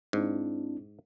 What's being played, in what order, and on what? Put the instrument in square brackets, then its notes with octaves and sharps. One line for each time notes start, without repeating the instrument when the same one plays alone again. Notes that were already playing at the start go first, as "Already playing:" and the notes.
[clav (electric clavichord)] G#2 [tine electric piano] C4 D4 E4